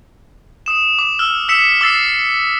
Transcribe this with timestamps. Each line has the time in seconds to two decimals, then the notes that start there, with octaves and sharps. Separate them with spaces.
0.66 D#6 E7
0.99 D6
1.19 E6 F6
1.49 E6 B6 C#7 E7
1.81 D6 E6 A6 C7